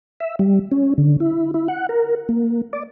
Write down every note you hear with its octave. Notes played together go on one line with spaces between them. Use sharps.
E5
G3
C#4
D3
E4
E4
F#5
A#4
A#3
D5